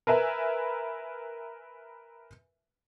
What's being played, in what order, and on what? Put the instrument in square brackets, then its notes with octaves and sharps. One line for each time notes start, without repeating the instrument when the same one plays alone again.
[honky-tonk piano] A#4 B4 E5 G#5 B5